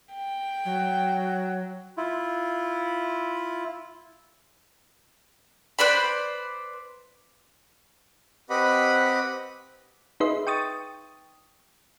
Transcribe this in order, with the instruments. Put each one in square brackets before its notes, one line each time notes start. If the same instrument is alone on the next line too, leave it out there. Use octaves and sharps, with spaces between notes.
[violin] G5
[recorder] F#3
[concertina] E4 F4
[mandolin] B4 C5 D5 B5
[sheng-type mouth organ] C4 G4 B4 D#5 F#5 B5
[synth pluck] D#4 G#4 B4 D#5 E5 C6
G5 C#6 D#6 A6